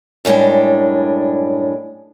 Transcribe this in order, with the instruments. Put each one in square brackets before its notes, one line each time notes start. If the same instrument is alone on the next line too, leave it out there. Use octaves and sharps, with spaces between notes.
[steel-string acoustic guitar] F#2 A2 G3 G#3 D4